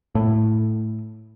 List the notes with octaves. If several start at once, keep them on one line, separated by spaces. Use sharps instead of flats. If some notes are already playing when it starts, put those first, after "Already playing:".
A2